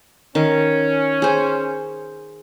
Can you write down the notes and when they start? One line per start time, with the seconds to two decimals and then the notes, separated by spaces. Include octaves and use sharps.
0.35 D#3 C#4
1.22 G#4 C5